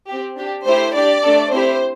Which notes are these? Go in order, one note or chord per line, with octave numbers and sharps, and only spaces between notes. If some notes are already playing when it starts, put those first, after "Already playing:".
C4 G4
D4 G4
A3 E4 G4 C5
D4 G4 D5
A3 D4 A4
C4 E4 G4 C5